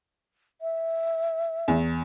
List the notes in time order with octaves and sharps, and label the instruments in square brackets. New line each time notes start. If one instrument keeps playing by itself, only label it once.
[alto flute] E5
[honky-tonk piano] E2